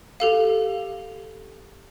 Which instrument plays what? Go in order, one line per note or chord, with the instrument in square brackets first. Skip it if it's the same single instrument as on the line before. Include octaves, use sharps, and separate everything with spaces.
[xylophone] G4 A4 F5